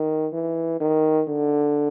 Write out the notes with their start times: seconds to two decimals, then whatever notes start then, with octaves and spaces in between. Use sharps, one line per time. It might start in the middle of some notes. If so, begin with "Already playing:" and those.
Already playing: D#3
0.33 E3
0.80 D#3
1.28 D3